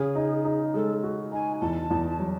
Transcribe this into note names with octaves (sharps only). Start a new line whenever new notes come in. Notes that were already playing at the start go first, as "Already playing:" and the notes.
Already playing: C#3 G#4
D#4
D#4
G#3 A4
F#4
D#4 G#5
E2 A5
E2
F#3